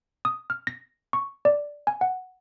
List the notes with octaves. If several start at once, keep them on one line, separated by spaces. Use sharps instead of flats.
D#6
F6
A#6
C#6
D5
G#5
F#5